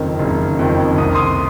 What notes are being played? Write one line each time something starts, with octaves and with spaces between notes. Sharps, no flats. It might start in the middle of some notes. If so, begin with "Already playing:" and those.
Already playing: F#1 F2 D#3
F#1
F2 D#3
C2 D#6
C6 D#6